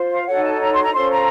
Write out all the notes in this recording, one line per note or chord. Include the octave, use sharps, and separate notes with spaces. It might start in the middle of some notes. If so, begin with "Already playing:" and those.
Already playing: F4 C5
F5
D#4 F#4 A4 C#5 F#5
A5
A#5
C6
A#5
C#4 F4 A4 C5 C6
A#5